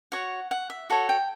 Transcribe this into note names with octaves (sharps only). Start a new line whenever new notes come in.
F#4 C#5 F#5
F#5
E5
F#4 A4 C#5 F#5
G5